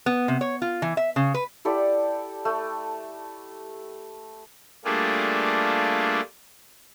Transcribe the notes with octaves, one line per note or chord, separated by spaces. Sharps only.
B3
C3
C#5
F4
E3
E5
C#3
B4
E4 G4 A4 D5
A3
G3 A3 A#3 D4 F4 G#4